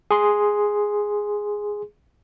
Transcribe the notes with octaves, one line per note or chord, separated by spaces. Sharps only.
G#4 C6